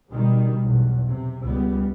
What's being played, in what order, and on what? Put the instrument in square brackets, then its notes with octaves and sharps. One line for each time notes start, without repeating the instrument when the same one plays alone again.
[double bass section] B2 D#3 G3
B1 E2
C3
C#2 G3 B3